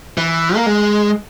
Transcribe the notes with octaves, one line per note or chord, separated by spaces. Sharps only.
E3
A#3
G#3